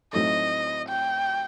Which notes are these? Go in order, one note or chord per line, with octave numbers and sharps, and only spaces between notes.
A2 F#3 C4 D#4 A4 D#5
G5